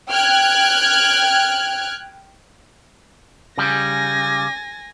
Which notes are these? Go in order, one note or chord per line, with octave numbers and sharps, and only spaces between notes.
G5 F6 F#6 G#6
C#3 G3 G#5 A#6